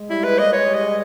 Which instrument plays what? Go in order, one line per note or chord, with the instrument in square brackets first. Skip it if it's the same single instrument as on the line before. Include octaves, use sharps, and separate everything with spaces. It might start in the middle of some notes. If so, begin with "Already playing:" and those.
Already playing: [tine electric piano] G#3
[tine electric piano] G3 [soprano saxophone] E4
[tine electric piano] G#3 [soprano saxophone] B4
[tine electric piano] A#3 [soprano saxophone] D#5
[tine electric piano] G#3 [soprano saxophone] C#5
[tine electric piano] G3
[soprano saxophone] D#5
[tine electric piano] G#3